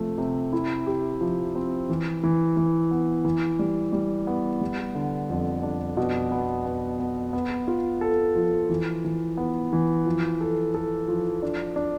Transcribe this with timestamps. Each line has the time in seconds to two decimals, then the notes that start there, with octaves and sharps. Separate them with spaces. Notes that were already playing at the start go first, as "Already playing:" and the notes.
Already playing: C3 F3 A3
0.18 C3
0.53 E4
0.87 G4
1.21 F3
1.55 C4
1.89 E3
2.23 E3
2.57 E3
2.91 B3
3.25 E3
3.59 G3
3.93 G3
4.27 B3
4.61 G3
4.95 D3
5.30 F2
5.63 D4
5.97 B2
6.32 B3
6.66 B3
6.99 B3
7.33 B3
7.68 F4
8.01 A4
8.35 F3
8.70 E3
9.05 E3
9.37 B3
9.73 E3
10.06 F3
10.41 A4
10.74 A4
11.08 F3
11.42 D4
11.76 D4